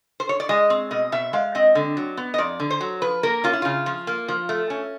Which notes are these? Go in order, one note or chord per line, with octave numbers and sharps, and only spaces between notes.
C5
C#5
D5
G#3 D#5
C4
B2 D#5
B2 E5
G#3 F5
C4 D#5
D3
F#3
B3
D#5
F2 D5
D3
C5
F#3
F3 B4
A#3 A#4
C#4 F4
E4
C#3 F4
F3
A#3
F3
A3
C#4